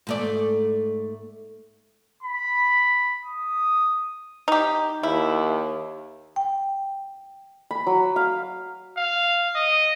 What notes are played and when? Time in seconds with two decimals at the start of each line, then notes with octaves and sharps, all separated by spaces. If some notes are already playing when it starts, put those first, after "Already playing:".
0.07 G#2 A3 D5
2.23 B5
3.26 D#6
4.48 D#4 G4
5.03 D#2 E4
6.36 G5
7.71 B5
7.87 F#3
8.16 F5
8.97 F5
9.55 D#5